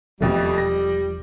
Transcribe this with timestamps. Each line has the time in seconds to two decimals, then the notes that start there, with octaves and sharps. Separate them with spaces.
0.21 E1 F2 B2 F3 G3 A3
0.58 A#6